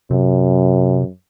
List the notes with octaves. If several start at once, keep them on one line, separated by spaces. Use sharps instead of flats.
F#2 C3